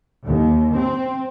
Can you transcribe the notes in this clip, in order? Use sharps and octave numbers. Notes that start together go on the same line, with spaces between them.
D#2
C4